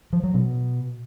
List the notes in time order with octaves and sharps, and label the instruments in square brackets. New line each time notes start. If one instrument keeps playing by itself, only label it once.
[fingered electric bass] F3
F#3
B2